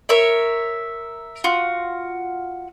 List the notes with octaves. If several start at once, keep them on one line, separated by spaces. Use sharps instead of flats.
A#4 C#5 E5
F4 F#4